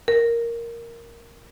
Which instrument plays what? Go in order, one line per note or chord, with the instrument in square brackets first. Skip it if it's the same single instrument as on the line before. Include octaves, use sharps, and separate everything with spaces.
[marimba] A#4